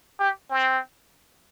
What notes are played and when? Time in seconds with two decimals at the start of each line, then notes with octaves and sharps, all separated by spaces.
0.20 G4
0.50 C4